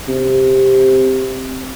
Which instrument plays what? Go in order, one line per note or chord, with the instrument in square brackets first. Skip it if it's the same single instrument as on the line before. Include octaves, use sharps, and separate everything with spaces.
[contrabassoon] C3